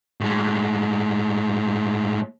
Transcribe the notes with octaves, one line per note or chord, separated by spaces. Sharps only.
A2 G#3